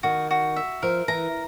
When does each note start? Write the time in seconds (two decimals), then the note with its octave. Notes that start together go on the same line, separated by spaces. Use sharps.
0.03 D#3 F#4
0.31 F#4
0.56 E5
0.83 F3 A#4
1.08 E3 A#5